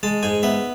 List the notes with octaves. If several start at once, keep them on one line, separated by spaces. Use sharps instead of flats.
G#3 A5
G#2 G#5
B3 E5